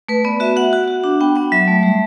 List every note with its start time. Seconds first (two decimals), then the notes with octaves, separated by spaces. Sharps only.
0.09 A3 B4
0.24 B3 D5
0.40 F#4 E5
0.56 F#4 F#5
0.73 F#4
0.88 F#4
1.04 D4
1.21 B3 G5
1.36 B3 F#5
1.52 F#3 E5
1.68 A3
1.83 G3